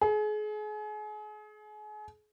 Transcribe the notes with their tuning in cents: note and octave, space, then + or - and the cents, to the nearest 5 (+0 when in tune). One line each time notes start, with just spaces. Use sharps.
G#4 +35